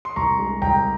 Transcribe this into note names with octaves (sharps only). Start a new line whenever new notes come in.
C6
C2 A#5 C#6
G#3
C2 G5 A#5